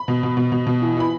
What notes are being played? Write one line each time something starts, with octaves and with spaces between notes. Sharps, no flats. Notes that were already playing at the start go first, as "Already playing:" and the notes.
Already playing: B5
B2
B2
B2
B2
B2
E3
E3 B5